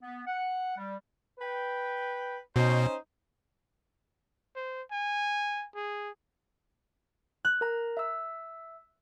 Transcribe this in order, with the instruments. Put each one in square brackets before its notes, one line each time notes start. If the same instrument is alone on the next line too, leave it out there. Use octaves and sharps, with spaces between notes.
[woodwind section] B3
F#5
G3
[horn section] B4 G5
[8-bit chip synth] B2 [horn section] C#4 D#4 C5
[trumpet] C5
G#5
G#4
[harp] F#6
[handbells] A#4 A#5
E5 E6